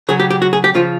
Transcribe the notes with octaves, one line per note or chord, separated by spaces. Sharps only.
C#3 F#3 G#4
G4
G4
F#4
G#4
G4
C#3 F3 F4